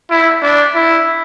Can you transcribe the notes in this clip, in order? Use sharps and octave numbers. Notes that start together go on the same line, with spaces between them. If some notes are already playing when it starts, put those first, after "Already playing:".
E4
D4
E4